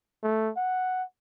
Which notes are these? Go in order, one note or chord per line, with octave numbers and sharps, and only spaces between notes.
A3
F#5